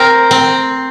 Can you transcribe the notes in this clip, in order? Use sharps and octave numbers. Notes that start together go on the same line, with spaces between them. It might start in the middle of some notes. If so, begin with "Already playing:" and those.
Already playing: C4 A#4
C4